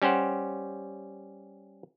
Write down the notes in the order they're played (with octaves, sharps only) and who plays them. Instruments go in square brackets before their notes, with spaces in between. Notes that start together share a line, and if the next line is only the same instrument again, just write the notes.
[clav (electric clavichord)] G3 C#4 G4 C5 F#5